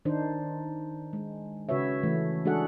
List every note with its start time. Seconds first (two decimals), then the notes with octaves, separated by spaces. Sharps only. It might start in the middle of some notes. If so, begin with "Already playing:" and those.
0.05 D#3 D4 D#4 C5
1.13 G#3
1.69 C#3 F#4 B4 C#5 E5
2.03 E3 A3
2.45 G#3 D4 F#4 G#4 A4 F#5